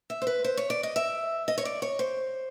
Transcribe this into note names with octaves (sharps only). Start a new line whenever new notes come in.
E5
C5
B4
C5
C#5
D5
D#5
E5
D#5
C#5
D5
C#5
C5